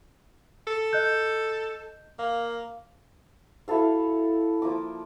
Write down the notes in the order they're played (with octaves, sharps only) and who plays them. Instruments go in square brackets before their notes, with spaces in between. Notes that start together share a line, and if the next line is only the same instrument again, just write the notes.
[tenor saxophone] A4
[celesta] D#5 F#6 G6
[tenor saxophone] A#3 [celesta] F5
[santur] E4 F#4 A4 F5
F3 A#3 D#5 D6